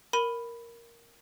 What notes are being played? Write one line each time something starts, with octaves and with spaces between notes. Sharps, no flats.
A#4 B5 D#7